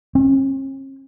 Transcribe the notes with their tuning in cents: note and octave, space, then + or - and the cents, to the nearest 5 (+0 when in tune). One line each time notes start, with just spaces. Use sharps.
C#4 -45